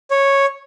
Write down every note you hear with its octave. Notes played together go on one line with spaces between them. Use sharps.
C#5